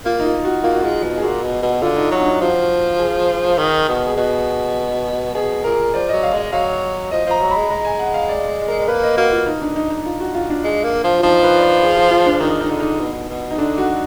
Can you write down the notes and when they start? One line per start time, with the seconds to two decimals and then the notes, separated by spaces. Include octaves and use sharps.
0.05 A#3 F4
0.20 D#4
0.26 F4
0.45 F#4
0.64 A#3 F4
0.74 F#4
0.82 G#3 F4
1.03 B2
1.18 G#4
1.22 A#2 F#4
1.43 B2
1.62 B2
1.82 D3 F4
1.97 D#4
2.11 F#3 F#4
2.20 D4
2.26 D#4
2.41 F3 F#4
2.99 G#4
3.58 D#3
3.88 B2
4.07 G#4
4.17 B2 F#4
5.35 B2 G#4
5.64 A#2 A#4
5.94 F3 D5
6.09 F#3 D#5
6.23 F5
6.33 G#3 D#5
6.52 F#3 F5
7.11 F3 D#5
7.26 F3 A#5
7.41 F#3
7.51 G#3 B5
7.70 G#3 A#5
7.85 G#5
7.99 F#5
8.14 F5
8.29 D5
8.68 A#4
8.88 A#3 B4
9.03 D#5
9.17 A#3 F#4
9.32 F4
9.46 D#4
9.62 D4
9.76 D#4
9.90 D#4
10.06 F4
10.20 F#4
10.35 F4
10.50 D4
10.64 G#3
10.84 A#3
11.04 F3
11.19 F4
11.23 F3 D#4
11.43 B4
11.57 D5
11.62 B4
11.83 G#4
11.97 F4
12.11 F4
12.26 D4
12.40 D#3 D#4
12.61 D#4
12.70 D3
12.80 D#4
13.00 B2
13.29 B2
13.51 D#4
13.58 D3 D4
13.78 F#4